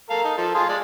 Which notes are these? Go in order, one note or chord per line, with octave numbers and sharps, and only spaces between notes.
A4 A#4 F5
D#4
F3 A4
F4 G#4
G#3 D5